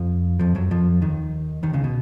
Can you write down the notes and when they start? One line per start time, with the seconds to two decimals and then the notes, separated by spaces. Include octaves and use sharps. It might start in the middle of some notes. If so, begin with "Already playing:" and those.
Already playing: F2 F3
0.39 F2 F3
0.55 F#2 F#3
0.71 F2 F3
1.02 D#2 D#3
1.63 D#2 D#3
1.73 C#2 C#3
1.84 B2